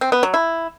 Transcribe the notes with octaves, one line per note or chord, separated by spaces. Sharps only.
C4
B3
F#3
E4